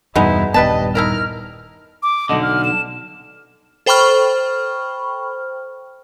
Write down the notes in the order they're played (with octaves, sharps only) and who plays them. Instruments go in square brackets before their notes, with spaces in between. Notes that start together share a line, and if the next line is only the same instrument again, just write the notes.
[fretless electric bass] E2 G2 B2 [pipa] G#3 B3 D#4 [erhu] E4
[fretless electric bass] D#1 G2 B3 [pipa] G3 B4 A5 [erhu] D#5
[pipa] D#4 E4 A#4 [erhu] F6
[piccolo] D6
[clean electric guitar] B1 D3 [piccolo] D#5
[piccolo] F6
E7
[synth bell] A4 C5 G5 B5 C#6 F6